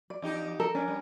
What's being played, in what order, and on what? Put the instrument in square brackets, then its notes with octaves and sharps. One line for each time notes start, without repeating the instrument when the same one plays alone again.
[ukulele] D5
[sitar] E2 D#4 G4
[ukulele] A4 [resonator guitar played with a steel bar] A#4
[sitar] F2 D4 [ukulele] C#4
[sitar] G3